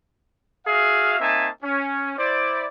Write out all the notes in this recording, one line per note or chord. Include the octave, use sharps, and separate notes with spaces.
F#4 G#4 E5 F5
A#3 C4 D#4 E5 G#5 A5
C#4
E4 C5 D5